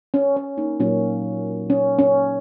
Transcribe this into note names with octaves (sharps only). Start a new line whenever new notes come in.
C#4
C#4
A#3 D#4
A#2 F#3 A#3 C#4
C#4
C#4